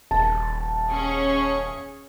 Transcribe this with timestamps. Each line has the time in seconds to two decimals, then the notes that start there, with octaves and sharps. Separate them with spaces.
0.11 D#1 A5
0.91 C#4 G#4 C#6